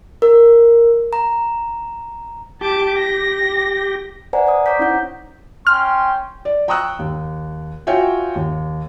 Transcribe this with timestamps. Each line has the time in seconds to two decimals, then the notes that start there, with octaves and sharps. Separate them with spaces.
0.22 A#4
1.13 A#5
2.61 G4 A5 D6
2.97 A#6
4.33 B4 C5 D5 F#5 G#5 A#5
4.47 C5 D5 D#6
4.66 C#5 A#5 D6 G6 B6
4.79 C#4 D#4 E4 F#5 G6
5.67 C#4 G5 C6 F6
6.45 D5
6.68 G5 A#5 C#6 D#6 E6 F#6
6.99 D#2
7.87 F4 F#4 C#5 E5 G5 G#5
8.36 D#2